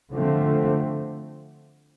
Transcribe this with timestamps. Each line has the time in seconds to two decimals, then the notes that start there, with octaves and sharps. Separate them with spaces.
0.11 D3 F3 A3 C4